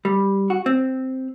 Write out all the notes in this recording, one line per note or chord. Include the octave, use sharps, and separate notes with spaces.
G3
F#4
C4